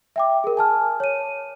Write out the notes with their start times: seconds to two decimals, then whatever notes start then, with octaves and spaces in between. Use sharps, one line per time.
0.16 E5 G5 D6
0.44 G#4 A#4
0.57 G#5 A5 F6
1.00 C#5 D#7